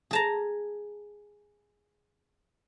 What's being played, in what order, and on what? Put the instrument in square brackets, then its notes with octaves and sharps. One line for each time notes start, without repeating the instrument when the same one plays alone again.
[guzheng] G#4 A5 A#5